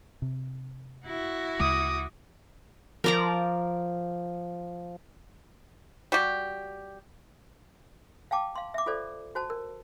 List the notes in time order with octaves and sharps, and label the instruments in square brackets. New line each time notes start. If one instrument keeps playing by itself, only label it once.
[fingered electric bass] C3
[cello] E4 F#4
[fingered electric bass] D2 C#3 G#3 [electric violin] D6 D#6
[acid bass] F3 [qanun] A#4 D5 A#5
[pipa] G3 F#4 G4
[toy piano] F5 G5 A5 D6
F5 C6
E5 D6
F4 A4 C5 D5
F#4 C5 A5
A#4